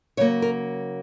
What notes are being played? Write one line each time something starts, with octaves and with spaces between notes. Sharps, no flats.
C#3 F#3 A#3 C#5
A#4